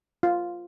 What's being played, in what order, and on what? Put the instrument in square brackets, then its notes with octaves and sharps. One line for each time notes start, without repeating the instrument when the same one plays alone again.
[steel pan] F4